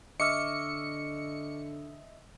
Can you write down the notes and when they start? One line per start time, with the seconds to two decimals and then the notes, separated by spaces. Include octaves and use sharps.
0.20 D3 D#5 E5 C#6 D6 E6 F6 C#7